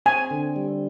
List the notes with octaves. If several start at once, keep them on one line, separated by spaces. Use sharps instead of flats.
C4 G#5
D3
G3